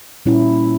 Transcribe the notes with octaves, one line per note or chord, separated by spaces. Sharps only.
A#2 G3 C#4 E4